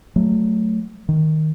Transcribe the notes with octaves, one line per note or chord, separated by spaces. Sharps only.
F#3 A3
D#3